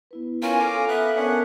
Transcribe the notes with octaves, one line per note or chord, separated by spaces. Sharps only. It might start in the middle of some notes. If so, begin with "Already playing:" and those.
B3 E4 B4
C#4 F4 A#4 G#5
A4 F5 A#5 D6
B3 E5 F#6
B3 C#4 D4 A#4 F#5